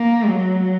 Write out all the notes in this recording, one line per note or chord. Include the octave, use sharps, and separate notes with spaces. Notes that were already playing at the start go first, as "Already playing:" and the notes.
Already playing: A#3
F#3